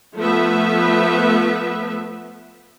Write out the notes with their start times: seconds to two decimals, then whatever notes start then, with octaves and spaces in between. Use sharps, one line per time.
0.18 F3 A3 B3 B4 E5